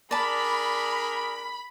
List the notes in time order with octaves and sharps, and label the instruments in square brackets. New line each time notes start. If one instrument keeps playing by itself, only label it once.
[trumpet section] D4 G#4 A#4 [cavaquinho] D5 A5 [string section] B5